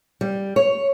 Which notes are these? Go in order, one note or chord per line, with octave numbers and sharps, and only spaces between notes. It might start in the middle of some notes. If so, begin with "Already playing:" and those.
G3
C#5